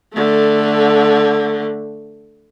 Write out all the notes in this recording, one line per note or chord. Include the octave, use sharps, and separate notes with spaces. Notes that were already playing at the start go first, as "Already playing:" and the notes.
D3 A3